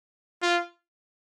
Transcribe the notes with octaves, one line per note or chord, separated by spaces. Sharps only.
F4